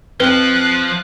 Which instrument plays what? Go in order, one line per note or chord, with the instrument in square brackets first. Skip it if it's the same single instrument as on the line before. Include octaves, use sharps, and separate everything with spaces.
[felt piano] F2 G5 F6 [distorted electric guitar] F3 [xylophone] B4 [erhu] F#6